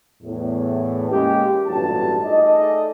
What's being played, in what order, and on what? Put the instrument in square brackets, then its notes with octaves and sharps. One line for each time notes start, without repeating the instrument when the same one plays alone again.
[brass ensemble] E2 A2
G#3 A#3 C#4 G4
A1 G2 A#2 F#3 A5
A3 D#4 G#4 A4 D5 D#5